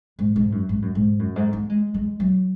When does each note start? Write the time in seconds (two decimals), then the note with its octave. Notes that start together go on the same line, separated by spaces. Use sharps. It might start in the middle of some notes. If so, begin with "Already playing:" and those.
0.19 G#2
0.36 G#2
0.52 F#2
0.69 G#2
0.82 F#2
0.95 G#2
1.19 F#2
1.36 G#2
1.53 A#3
1.70 G#3
1.94 G#3
2.20 F#3